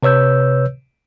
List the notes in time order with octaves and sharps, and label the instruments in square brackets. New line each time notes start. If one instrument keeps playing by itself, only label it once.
[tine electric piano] C3 B4 C#5 E6 G6